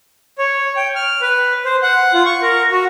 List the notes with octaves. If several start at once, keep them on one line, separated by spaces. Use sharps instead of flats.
C#5
G5
F6
B4
C5
F#5
F4
C#6
A#4
F#4